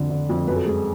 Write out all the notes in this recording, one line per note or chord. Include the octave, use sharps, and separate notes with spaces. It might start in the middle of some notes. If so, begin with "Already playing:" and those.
Already playing: F2 D3 A4
D3
F2
F#2 B4
A4
G#3 G#4